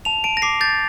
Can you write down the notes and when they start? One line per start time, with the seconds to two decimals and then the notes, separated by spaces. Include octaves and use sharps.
0.05 A5 F7
0.24 A5 D7
0.37 A#6
0.42 D6 C7
0.61 G6 A6